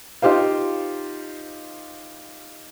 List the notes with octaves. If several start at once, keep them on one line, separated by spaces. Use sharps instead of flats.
D#4 F4 G4 C5 F5